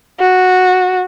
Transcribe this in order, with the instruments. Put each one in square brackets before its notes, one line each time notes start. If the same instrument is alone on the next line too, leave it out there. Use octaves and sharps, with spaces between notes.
[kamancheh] F#4